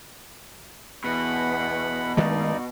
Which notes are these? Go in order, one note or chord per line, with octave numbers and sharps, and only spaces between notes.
E2 B2 F#5 B5
G2 D#3 G#3 A3 D#4 D5